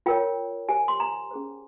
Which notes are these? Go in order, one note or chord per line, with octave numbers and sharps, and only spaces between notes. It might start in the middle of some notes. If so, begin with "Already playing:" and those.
F4 A#4 C#5 G5
G4 C5 G#5
C6
A#5
C#4 G#4 C5